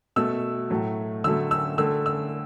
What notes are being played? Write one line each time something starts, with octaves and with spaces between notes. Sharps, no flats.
B2 A3 E6
A2 F#3 A3
D3 F#3 A3 E6
E6
D3 A3 E6
E6